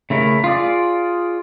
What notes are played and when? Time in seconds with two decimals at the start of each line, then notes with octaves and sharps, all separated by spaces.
0.10 C#3 A3 E4 A#4
0.44 F4 G#4 D5